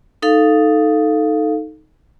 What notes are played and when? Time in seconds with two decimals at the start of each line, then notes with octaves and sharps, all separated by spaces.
0.22 D#4 A4 F5